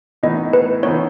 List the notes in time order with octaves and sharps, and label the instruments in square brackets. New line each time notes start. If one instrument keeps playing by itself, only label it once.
[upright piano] A2 E3 B3 D#4 [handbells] D#5
[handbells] B4
[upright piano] A2 E3 B3 D#4 [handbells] C#5